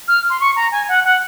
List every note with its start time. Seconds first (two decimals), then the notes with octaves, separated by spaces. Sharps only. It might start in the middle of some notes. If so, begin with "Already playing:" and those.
0.08 F6
0.30 C6
0.40 C#6
0.56 A#5
0.72 G#5
0.89 F#5
1.05 F#5